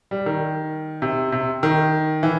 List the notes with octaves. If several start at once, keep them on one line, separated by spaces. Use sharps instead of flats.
G3
D#3
C3
C3
D#3
E3